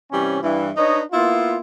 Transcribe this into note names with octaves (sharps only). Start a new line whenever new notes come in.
C3 E3 G3 C#4
G2 E3
D4 D#4 B4 C#5 D#5
A#3 B3 E4 F4